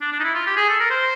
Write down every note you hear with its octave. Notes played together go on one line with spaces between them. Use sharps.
D4
D4
D#4
E4
F4
G4
G#4
A4
A#4
C5